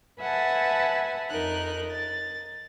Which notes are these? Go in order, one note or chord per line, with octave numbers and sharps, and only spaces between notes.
B4 E5 F#5 G#5 A5
F2 D#4 A#4 F#6
A6